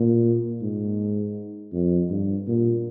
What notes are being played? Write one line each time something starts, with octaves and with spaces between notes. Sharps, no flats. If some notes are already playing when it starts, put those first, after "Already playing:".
Already playing: A#2
G#2
F2
G2
A#2